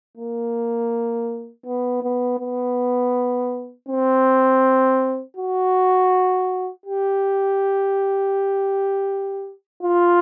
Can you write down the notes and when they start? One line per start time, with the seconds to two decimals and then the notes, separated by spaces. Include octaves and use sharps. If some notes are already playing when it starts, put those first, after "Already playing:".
0.17 A#3
1.66 B3
2.03 B3
2.40 B3
3.88 C4
5.37 F#4
6.86 G4
9.83 F4